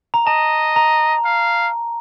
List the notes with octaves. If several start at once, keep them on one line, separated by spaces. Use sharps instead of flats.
A#5
D#5 A5
A#5
F5